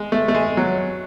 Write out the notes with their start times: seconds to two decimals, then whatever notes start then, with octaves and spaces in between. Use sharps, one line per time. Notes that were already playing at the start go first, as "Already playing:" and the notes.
Already playing: G#3
0.12 A3
0.28 A3
0.35 G#3
0.57 F#3